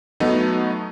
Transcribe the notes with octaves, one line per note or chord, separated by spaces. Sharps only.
F#3 A3 B3 D#4